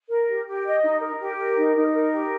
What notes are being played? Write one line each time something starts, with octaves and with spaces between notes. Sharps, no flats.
A#4
G4
G4
D#5
D#4
A#4
G4
A#4
D#4
D#4
A#4
G4